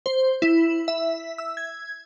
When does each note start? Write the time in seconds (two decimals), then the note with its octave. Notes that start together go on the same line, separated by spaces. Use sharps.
0.06 C5
0.42 E4
0.88 E5
1.38 E6
1.57 G#6